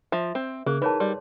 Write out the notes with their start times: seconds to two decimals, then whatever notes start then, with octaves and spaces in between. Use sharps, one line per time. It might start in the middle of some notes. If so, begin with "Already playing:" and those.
0.12 F3 E5
0.35 C4
0.66 C#3 A#3 G#4 F#6
0.82 E3 D#4 A#4 B4 C#5 A5
1.00 G3 C6